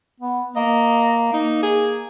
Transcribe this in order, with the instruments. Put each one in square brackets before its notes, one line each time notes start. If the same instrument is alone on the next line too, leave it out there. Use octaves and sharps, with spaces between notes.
[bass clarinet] B3
[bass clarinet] A#3 [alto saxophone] D#5
[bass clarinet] A#3 [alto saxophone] D#4
[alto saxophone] G#4